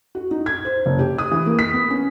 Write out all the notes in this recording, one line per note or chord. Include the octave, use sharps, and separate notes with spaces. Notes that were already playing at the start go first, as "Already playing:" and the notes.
F#4
D#4
G#6
C5
F#1
G4
D#6
E3
A#3
B6
B3
C#4